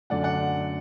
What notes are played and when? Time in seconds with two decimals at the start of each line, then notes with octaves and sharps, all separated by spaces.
0.10 F#2 D3 A3 D5 F#5
0.24 D5 F#5